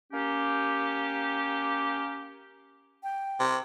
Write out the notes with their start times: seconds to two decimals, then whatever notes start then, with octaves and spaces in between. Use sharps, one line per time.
0.11 A#3 C#4 G4
3.03 G5
3.40 C3